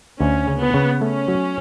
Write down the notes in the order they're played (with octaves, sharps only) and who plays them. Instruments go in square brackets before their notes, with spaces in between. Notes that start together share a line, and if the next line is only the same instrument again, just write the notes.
[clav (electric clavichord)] D2 [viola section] C#4
[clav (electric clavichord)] C#3
[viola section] B3
[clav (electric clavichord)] C#3
[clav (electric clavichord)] A3 [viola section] C#4
[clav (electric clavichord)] F#3